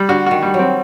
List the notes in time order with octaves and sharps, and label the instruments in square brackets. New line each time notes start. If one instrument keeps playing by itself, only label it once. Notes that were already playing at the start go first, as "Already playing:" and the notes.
Already playing: [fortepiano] G3
[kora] D3 [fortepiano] F#4
[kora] D#3 [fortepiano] F#4
[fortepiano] G3
[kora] F#3
[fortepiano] C4